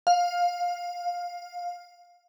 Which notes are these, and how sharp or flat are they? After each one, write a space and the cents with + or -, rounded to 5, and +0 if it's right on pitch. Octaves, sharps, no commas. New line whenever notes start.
F5 +15